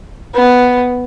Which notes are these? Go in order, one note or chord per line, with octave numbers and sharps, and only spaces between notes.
B3